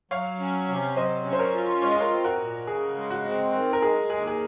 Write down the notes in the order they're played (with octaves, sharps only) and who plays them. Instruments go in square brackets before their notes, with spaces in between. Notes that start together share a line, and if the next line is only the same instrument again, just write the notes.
[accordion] F#3 [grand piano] C#5 F5
[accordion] C#4
C3
[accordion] F#3 [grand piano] C5 D#5
[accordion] C#4
[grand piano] C5
A#4 C#5
[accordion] F4
[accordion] G#3 [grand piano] C#5
[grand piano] D#5
A#4 C#5
[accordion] C4
[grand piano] F#4 A#4
[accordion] A#2
[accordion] C#3 [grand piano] G#4
[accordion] G#3
[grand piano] F#4
[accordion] C4
D#3
[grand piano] A#4
[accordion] G#3 [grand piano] G#4
[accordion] D#2 [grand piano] G#4
[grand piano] G#4